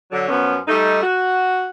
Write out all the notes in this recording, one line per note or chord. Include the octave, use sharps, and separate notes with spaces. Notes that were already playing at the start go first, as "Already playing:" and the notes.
D3 F#3
F#2 F3 B3 C#4
G3 A3 D#4
F#4